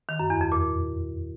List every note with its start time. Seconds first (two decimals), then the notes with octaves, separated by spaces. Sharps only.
0.09 D#3
0.19 F#2
0.30 E2
0.41 F2
0.52 A#2